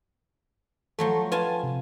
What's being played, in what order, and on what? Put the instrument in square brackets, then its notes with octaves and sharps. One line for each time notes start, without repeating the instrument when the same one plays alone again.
[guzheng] F3 F#3 A3 [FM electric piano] A4
[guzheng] F4 G#5 A5 [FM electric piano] B4
[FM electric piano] C3